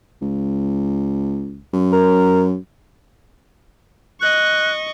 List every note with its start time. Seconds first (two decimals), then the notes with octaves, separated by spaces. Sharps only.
0.22 C#2
1.74 F#2
1.92 A#4
4.21 D#5 C#6 F#6